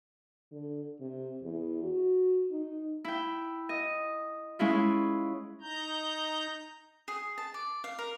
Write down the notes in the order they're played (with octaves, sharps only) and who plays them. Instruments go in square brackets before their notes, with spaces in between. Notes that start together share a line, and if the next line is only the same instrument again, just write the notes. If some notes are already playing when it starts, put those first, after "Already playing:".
[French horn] D3
C3
E2
F#4
D#4
[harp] E4 G5
D#5
G#3 C#4 E4 F4
[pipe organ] D#4 A#5 G6
[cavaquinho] G#4
A5
D5
F5
A#4